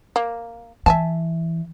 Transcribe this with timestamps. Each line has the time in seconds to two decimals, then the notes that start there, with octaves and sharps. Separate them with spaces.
0.16 A#3
0.86 E3 E5 G#5 A5